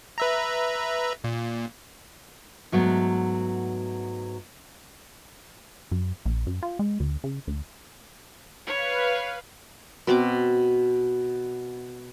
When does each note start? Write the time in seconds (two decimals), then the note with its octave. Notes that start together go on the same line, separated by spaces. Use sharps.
0.18 B4 E5 A#5
1.24 A#2
2.72 G#2 F#3 A3 B3
5.92 F#2
6.26 A#1
6.47 F#2
6.63 F4
6.79 G#3
7.00 D2
7.24 C#3
7.47 D2
8.66 B4 C#5 F5
10.07 B2 C4 F#4 D6